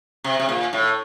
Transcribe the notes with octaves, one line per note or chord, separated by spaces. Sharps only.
C3
C3
A#2
A2